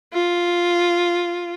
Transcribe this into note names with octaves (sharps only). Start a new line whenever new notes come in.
F4